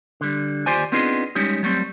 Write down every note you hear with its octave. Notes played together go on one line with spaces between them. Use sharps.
D3 G3
D#2 F4 G4 C5 D5 G#5
B3 C4 D4 D#4 F4 G#4
G3 G#3 C#4 D#4 G4
F#3 G3 A3 C4